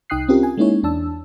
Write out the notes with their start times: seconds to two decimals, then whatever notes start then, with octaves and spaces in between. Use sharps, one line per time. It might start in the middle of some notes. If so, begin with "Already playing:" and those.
0.10 C2 D#4 G5 D#6 F#6 C7
0.29 C4 C#4 F4 G4 A#4
0.43 G#5
0.57 G#3 A#3 C#4 D#4 E4 C#5
0.83 E2 D4 A5 E6